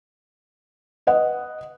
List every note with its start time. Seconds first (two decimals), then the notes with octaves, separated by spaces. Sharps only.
1.07 B4 D#5 F#5